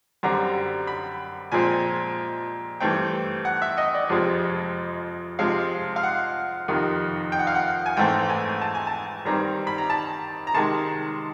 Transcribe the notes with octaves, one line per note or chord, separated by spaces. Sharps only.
F#2 D3 G3 C4 A#5
B5
A#2 F3 G#3 C4 G#5
G2 E3 A3 C4 G5
F#5
E5
D#5
D5
F2 C3 F3 G#3 C4
C3 F3 G#3 C4 F5
F5
F#5
F2 C3 D#3
G5
F#5
F5
F#5
G#5
G#2 E3 A3 C4 G5
G#5
A5
G#5
A5
G2 D#3 G3 C4 A#5
B5
A#5
A5
A#5
C3 D#3 G#3 A5